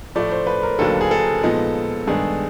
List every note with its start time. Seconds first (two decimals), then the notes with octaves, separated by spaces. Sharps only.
0.15 A2 F3 A3 D5
0.32 C5
0.47 B4
0.63 A#4
0.79 D#2 D3 F#3 A#3 A4
1.01 G#4
1.11 A4
1.43 A#2 F3 G#3 B3 D#4
2.07 G2 D#3 G#3 B3 D4 G#4